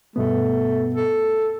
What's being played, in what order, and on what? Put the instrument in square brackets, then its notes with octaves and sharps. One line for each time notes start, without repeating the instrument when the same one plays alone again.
[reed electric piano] G2 B2 B3 [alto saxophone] A3
[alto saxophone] A4